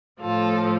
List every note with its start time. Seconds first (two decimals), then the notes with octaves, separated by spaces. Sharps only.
0.21 A2 F3 F4 A4